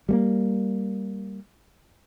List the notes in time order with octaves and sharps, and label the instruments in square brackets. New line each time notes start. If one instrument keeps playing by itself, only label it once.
[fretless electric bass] G3 A3 A#3